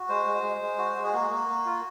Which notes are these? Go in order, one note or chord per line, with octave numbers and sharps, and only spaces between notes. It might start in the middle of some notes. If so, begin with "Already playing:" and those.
Already playing: F#4
G#3 C5
G#3
G#3
G#3
F#4
G#3
G#4
A#3 F#4
A#3
A#3
F4